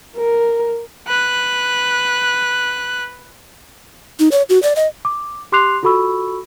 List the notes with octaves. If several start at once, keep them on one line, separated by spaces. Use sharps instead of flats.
A#4
B4 F#6
D#4
C#5
F#4
D5
D#5
D6
G4 C6 D6 F#6 C7 F7
F4 F#4 A4 B5 C#6 E6